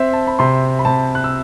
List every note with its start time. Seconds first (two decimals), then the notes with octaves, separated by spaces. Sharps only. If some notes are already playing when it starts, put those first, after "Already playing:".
Already playing: C4 E5
0.13 A5
0.27 B5
0.39 C3 C6
0.79 B5
0.85 C3 A5
1.15 F#6
1.24 E6